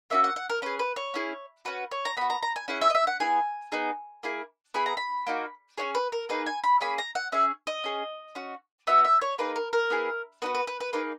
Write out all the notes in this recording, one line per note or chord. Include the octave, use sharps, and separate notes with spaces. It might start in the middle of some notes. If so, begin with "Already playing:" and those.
A#3 C#4 F#4 E5
F#5
F#5
A#4
C#4 G#4 B4
B4
C#5
C#4 E4 G#4
C#4 F#4 B4
C#5
A#5
B3 F#4 B5
A#5
A#5
G#5
C#4 E4 G#4 F#5
E5
D#5
E5
F#5
B3 E4 G#4 G#5
B3 D#4 G#4
A#3 E4 G#4
B3 E4 G#4 B5
A#5
B5
A#3 D#4 F#4
C#4 E4 G#4 C#5
B4
A#4
A#3 D#4 G#4 B4
G#5
B5
A#3 C#4 G#4 B5
A#5
F#5
C#4 G#4 E5
D#5
C#4 G#4
C#4 F#4
B3 F#4 E5
E5
C#5
A#3 D#4 G#4 B4
A#4
A#4
B3 E4 G#4
B3 D#4 F#4 B4
B4
B4
B4
A#3 D#4 G#4 B4